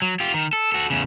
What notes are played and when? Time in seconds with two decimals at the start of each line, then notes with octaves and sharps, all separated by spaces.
0.02 F#3
0.20 F4 G4
0.34 D#3
0.53 A4
0.72 F#4 A4
0.90 E2 C#3